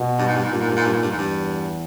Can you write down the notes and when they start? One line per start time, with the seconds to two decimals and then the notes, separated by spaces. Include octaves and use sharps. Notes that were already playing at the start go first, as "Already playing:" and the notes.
Already playing: B2
0.19 G2
0.27 G#2
0.35 G2
0.43 G#2
0.50 G2 A#2
0.60 G#2
0.69 G2
0.76 G#2
0.85 G2
0.93 G#2
1.02 G2
1.10 E2 G#2
1.18 G2